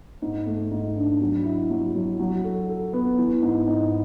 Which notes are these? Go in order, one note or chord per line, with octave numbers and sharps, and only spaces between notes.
G#2
A3
G#2
D4
F#3
E4
F#3
F#3
F#3
A4
A4
B3
E3
G#2
G#2